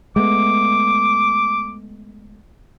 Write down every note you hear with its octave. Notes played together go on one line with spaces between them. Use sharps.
G#3 A3 B3 D6